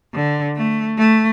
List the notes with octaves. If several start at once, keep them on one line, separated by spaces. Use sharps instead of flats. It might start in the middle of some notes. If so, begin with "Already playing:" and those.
D3
A3
A3